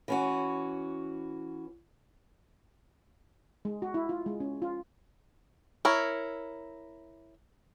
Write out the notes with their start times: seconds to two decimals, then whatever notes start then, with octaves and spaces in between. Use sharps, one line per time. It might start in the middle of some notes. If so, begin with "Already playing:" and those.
0.08 E3 C#4 F#4
3.65 G#3
3.82 F#4
3.94 E4
4.09 F4
4.26 G#3
4.40 C#4
4.62 F4
5.85 E4 A#4 C#5